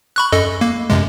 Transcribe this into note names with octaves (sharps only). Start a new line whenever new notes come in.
B5 C#6 F#6
F#2 A4 D#5
A#3
F#2 C3 G#3